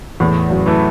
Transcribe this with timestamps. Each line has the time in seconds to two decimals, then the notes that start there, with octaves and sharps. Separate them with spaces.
0.20 E2 A2
0.50 F#2
0.66 E3 A3 E4